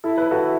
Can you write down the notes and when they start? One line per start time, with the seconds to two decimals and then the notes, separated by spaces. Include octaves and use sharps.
0.04 E4 A4
0.17 B4
0.31 F#4 A4